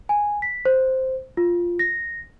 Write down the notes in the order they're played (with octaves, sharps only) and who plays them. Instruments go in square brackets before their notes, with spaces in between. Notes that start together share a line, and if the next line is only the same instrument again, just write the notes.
[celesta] G#5
B6
C5
F4
A#6